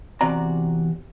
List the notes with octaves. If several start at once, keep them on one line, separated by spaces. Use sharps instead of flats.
E2 C3 F#4 D5 A#5